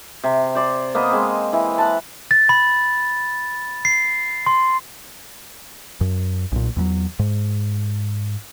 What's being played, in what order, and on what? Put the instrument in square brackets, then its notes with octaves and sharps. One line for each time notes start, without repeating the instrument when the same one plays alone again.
[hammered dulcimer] C3
C5 D5 C6
A#3 B3 C5 D#5
G#3 C4
E3
F#5 A5
[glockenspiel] A6
B5
C7
C6
[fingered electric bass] F#2
B1 A#2
E2 F3 F#3
G#2